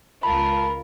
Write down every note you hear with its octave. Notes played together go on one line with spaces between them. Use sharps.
C#2 F4 A#4 A5 B5